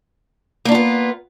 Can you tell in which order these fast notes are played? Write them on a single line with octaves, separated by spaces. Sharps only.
A#3 D4 F4 B3